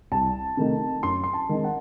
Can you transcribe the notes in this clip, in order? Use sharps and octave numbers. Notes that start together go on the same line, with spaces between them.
C2 A5
C3 D#3 A3 D#4
F#2 C6
C6
A5
D#3 G#3 C4 D#4
F#5